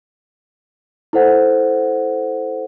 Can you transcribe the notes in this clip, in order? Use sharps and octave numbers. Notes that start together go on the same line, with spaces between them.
E4 A4 C5 F#5